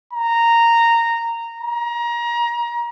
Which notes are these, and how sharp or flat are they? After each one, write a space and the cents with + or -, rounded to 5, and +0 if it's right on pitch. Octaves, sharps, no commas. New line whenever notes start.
A#5 -10
A#5 +25